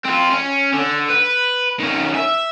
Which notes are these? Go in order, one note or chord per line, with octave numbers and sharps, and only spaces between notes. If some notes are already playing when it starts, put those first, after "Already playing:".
C4 F4
C#4
D3
B4
D#3 C#4
E5